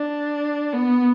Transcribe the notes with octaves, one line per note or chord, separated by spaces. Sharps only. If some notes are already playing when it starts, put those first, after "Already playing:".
Already playing: D4
B3